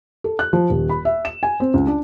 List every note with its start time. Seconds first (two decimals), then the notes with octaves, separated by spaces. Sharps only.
0.24 A4
0.39 F#6
0.53 F3
0.70 D#1
0.89 B5
1.05 E5
1.25 E7
1.43 G#5
1.60 C4
1.74 C#2
1.87 D4